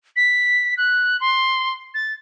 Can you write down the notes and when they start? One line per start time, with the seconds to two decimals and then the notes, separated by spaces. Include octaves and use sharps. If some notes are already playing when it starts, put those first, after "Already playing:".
0.16 B6
0.77 F#6
1.21 C6
1.94 A6